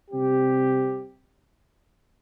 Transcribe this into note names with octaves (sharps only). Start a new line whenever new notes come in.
C3 G3 C4 G4